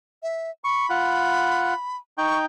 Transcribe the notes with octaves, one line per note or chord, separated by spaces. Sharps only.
E5
B5 C#6
F4 F#5
D#4 G5 C#6